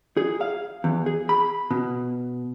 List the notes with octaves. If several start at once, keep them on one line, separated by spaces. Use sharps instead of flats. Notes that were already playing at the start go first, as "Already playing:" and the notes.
G#4
F5
E2
G#4
B5
B2